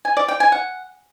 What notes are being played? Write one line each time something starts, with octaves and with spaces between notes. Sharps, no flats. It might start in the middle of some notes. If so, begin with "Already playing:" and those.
G#5
D5
G5
G#5
F#5